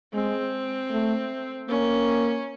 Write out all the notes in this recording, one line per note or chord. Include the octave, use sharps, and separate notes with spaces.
G#3 C4
A3
A#3 C#4